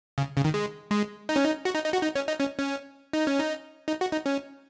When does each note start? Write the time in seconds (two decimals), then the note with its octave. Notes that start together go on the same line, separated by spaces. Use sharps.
0.18 C#3
0.36 C#3
0.44 D#3
0.54 G#3
0.91 G#3
1.29 D#4
1.36 C#4
1.45 D#4
1.65 F#4
1.75 D#4
1.85 D#4
1.93 F#4
2.03 D#4
2.15 C#4
2.28 D#4
2.39 C#4
2.59 C#4
3.13 D#4
3.27 C#4
3.39 D#4
3.88 D#4
4.01 F#4
4.12 D#4
4.26 C#4